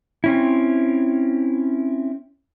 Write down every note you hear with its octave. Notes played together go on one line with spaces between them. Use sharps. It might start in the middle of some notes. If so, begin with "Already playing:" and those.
C4 C#4 E4